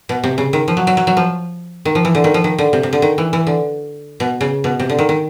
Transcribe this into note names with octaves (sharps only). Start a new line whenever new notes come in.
B2
C3
C#3
D#3
F3
F#3
F#3
F#3
F#3
F3
D#3
F3
E3
D3
D#3
F3
D#3
D3
C3
C3
D3
D#3
E3
E3
D3
B2
C#3
B2
C3
D3
D#3
D#3